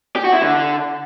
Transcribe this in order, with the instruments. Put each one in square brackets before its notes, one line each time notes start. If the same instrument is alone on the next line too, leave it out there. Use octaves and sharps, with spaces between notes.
[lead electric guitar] G4
F#4
E4
D3